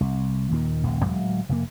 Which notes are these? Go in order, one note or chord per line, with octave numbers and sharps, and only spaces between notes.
C2
D#2 A#2 D#3
D#1 A#1 D#2 C#3
D1 F2 F#3 G#3
F1 A#2 A#3